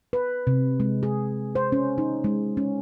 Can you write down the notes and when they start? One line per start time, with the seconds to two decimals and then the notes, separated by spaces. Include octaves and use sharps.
0.13 B4
0.47 C3
0.80 G#3
1.03 G#4
1.55 C5
1.72 C#4
1.98 D#4
2.24 G#3
2.57 C#4